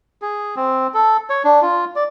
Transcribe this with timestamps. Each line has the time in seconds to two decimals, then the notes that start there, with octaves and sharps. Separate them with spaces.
0.22 G#4
0.56 C4
0.94 A4
1.30 C#5
1.44 D4
1.62 F4
1.96 D5